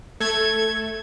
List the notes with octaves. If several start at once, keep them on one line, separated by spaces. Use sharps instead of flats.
A3 A4 G#6